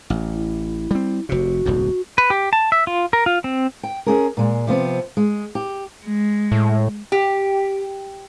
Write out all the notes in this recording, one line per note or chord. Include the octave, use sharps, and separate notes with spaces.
A1
E4
G3 C4
F1 C3 F#4
D#1 C2 G#2
B4
G4
A5
E5
F4
A#4
F4
C4
G5
C#4 D4 G#4 A#4
A#2 G#3
C3 F3 B3 C4
G#3
G4
G#3
A2
G4